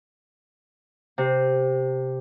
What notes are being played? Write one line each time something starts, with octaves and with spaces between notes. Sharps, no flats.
C3